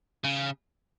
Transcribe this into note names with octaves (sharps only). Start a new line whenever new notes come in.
C#3